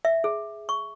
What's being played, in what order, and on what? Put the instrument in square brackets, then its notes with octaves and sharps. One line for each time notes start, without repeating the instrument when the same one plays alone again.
[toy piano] E5
G#4
C#6